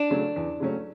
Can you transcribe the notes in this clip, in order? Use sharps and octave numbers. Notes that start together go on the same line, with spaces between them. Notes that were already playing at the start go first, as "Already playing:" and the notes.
Already playing: D4
C#3 F#3 A3 C#4
E2
C#3 F#3 A3 C#4